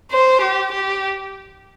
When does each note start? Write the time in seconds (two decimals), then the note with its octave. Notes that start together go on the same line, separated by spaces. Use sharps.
0.11 C5
0.41 G4
0.72 G4